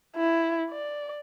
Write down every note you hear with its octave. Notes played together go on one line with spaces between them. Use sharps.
E4
D5